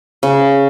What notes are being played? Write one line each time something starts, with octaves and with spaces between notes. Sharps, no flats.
C#3